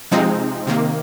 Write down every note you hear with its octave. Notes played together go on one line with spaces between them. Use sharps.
C3 F3 G#3 C4 D#4
C3 D#3 A#3